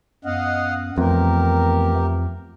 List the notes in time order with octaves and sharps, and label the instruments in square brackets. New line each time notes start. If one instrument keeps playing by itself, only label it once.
[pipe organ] F#2 B3 [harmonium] D#5 F5 F#5
[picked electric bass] F2 [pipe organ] E3 A3 B3 [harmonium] G4 A#4